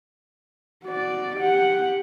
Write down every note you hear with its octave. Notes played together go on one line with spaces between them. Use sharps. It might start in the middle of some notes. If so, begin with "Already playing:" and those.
F#4 D5
G4 F#5